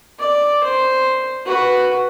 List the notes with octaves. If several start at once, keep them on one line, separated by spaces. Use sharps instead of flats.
D5
C5
F#4 B4